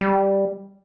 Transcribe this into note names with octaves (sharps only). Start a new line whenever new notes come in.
G3